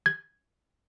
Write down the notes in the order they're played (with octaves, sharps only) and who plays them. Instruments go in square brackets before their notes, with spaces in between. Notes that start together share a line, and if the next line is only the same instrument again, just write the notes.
[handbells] G#6